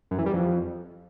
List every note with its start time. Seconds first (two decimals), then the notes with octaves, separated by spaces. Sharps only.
0.11 F#2
0.19 E3
0.26 G3
0.33 F2